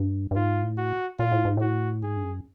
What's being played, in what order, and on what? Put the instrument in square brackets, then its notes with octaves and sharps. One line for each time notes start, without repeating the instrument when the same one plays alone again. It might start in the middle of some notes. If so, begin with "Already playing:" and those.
Already playing: [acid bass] G2
G2
[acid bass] G#2 [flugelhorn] F4
[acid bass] A2
[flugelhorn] F#4
[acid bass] A#2 [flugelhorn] F4
[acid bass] A2
G#2
[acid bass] A2 [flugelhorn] F#4
[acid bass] G#2 [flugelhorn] G#4
[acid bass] G2
F#2